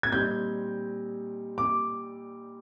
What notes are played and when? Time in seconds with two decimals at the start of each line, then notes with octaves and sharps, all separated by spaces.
0.03 G#6
0.12 A#2 G3 C4 D#4 G6
1.58 D6